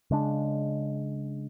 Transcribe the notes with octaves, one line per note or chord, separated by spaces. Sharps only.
C#3 G#3 D4